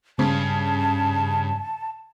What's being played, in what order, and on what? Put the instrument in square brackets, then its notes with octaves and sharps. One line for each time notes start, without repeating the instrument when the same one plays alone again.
[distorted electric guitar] G2 [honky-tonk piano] C#3 [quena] A5